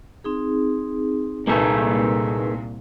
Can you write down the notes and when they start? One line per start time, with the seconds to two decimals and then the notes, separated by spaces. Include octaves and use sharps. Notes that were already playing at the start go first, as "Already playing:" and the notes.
0.24 C4 D#4 G#4
1.47 C2 A#2 A#3 D#4 G#4 A4 B4